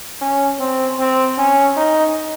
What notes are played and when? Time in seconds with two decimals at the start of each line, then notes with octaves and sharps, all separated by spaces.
0.21 C#4
0.60 C4
1.00 C4
1.38 C#4
1.77 D#4